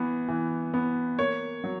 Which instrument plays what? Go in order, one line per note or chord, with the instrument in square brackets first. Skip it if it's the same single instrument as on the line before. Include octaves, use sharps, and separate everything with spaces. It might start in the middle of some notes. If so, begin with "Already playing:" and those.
Already playing: [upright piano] E3 B3
E3
B3
A#3 C#5
F#3